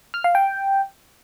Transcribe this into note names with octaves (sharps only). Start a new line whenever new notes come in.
F6
F5
G5